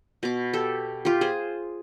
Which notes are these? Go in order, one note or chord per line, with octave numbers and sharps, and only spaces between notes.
B2 D6
G4 A4
F4 G4
G#4 C5